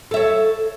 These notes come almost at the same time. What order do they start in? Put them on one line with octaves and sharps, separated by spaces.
A4 E5 C#5